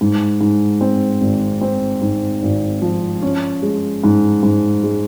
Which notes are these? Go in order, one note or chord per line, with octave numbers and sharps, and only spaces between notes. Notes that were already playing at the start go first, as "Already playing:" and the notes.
G#2
G#2
C4
G#1
C4
G#2
G#1
F3
C#4
G#3
G#2
G#2
G#3